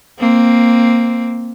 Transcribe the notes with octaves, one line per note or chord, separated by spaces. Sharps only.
A#3 C4